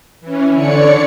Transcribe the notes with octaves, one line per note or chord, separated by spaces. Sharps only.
E3 C#4
D3 C#5 D5 C#7